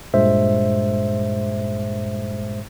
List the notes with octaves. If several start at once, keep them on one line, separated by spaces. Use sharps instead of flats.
G2 A#2 G#3 C5 E5